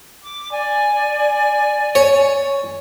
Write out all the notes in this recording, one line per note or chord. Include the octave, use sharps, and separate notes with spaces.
D6
D5 G#5
C#5